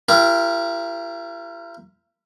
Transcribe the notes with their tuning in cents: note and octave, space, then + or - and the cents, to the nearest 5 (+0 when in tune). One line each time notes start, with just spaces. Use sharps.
E4 +45 G4 +0 A#4 +0